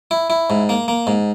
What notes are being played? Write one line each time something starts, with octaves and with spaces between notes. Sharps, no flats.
E4
E4
G#2
A#3
A#3
G#2